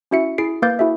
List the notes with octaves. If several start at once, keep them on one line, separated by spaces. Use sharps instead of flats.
C#4 E4 F#4 E5 C#7
E4 G#4 C7 D7
A#3 B4 F5 D6 G6 A6
E4 F#4 G#4 E5